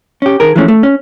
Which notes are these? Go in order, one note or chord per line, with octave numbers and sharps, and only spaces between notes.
C#4 G4
D#3 G#4 A#4
E3 F3 G#3 A3 C#4
A3
C#4